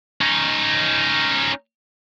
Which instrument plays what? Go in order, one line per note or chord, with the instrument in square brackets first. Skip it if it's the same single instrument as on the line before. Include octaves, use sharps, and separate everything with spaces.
[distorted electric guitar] C#4 D#4